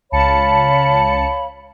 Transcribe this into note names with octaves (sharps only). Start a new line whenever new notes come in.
C#2 C#5 F5 A5 B5 C#7